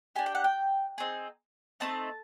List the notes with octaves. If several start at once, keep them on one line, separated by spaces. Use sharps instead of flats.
D4 G4 G#5
G5
F#5
G5
C4 D#4 G#4
A3 C4 D#4 A5